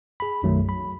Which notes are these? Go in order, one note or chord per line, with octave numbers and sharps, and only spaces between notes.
G#4 B5
B1 F#2 D#3 F#3 A3
B5